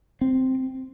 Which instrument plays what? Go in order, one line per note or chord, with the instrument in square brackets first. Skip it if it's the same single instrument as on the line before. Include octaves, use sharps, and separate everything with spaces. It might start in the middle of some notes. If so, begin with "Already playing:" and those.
[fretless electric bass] C4